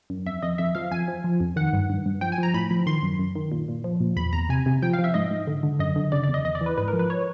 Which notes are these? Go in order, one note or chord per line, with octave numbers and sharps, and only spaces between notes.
F#2
F2 E5
F2 D#5
F2 E5
F3 F5
F2 G#5
F3
F3
F2
D#3 F#5
G2
G2
G2
F3 G5
G#5
F3 A#5
A2 B5
F3
D#3 C6
F#2
F#2
D#3
A#2
A#2
F3
A#2
E2 B5
E2 A#5
C3 G#5
C3
F3 G5
F5
F3
E5
G#2 D#5
G#2
D3
D3
F#2 D#5
D3
C#3 D5
D5
E2
D#5
E2 D#5
D5
E3
B4
G#2 B4
A#4
F3
B4
C#5